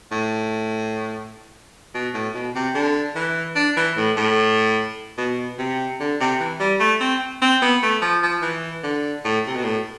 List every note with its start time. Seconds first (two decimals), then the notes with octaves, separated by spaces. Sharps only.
0.12 A2
1.94 B2
2.14 A2
2.35 B2
2.55 C3
2.75 D3
3.15 E3
3.56 D4
3.76 E3
3.97 A2
4.17 A2
5.18 B2
5.58 C3
6.00 D3
6.20 C3
6.40 E3
6.60 G3
6.80 A3
7.01 C4
7.42 C4
7.62 B3
7.83 A3
8.02 F3
8.23 F3
8.42 E3
8.83 D3
9.25 A2
9.47 C3
9.56 B2
9.64 A2